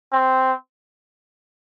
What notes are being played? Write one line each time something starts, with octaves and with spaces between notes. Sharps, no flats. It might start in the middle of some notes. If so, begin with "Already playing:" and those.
C4